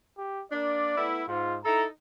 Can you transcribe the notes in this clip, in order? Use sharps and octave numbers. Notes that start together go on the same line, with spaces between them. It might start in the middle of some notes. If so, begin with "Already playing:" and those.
G4
A#3 D4 D5
A3 B3 E4
G#2 F4
D#4 E4 A4 A#5